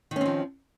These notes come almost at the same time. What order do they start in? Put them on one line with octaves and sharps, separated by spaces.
D#3 C#4 C4 F3